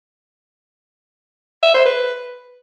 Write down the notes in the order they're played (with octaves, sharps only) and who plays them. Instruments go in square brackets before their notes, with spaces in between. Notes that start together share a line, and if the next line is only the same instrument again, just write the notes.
[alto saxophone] E5
C5
B4